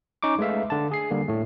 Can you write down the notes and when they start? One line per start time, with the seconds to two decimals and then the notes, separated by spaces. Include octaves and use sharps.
0.23 C#4 D#4 C#6 D6
0.39 G#3 A3 B4 E5 F5
0.70 D3 A5
0.92 G#4 C7
1.11 D3 G3 A#3
1.28 A2 A3